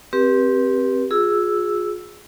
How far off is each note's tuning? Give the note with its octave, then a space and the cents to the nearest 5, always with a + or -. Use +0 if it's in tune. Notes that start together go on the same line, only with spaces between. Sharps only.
C4 +10 G4 +0 B4 -35
F4 +35 G#4 +0 E6 +0